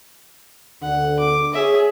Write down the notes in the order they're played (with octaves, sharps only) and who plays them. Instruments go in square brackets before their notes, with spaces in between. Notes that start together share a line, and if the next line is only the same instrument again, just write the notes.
[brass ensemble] D2 D3 [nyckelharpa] F#5
[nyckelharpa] D6
[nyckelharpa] G#4 E5 [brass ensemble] C#5